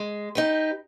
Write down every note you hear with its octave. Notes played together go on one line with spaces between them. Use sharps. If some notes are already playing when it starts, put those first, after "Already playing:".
Already playing: G#3
D#4 G4 B4